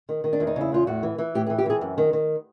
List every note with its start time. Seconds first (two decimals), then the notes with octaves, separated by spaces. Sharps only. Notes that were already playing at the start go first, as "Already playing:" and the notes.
0.09 D#3
0.24 D#3
0.33 D4
0.40 E2
0.47 D#4
0.56 C#3 E4
0.72 E2 F4
0.87 A2 F#4
1.03 E3
1.18 E3
1.35 A2 G4
1.46 G#4
1.50 E3
1.58 G4
1.66 E3 G#4
1.81 F#2
1.98 D#3
2.13 D#3